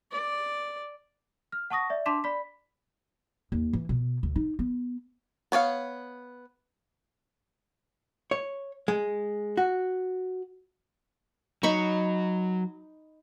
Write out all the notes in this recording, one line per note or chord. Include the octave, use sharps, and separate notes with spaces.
D5
F6
F#5 A5 C#6 D#6 A#6
D5 E5
D4 A5 C6 D6 B6 E7
D5 B5 B6
D#2
E3
B2
D2
D#4
B3
B3 C#5 D5 F5
C#5
G#3
F#4
F#3 D#4 B5 C#6